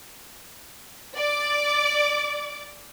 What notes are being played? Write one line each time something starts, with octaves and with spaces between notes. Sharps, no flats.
D5 D6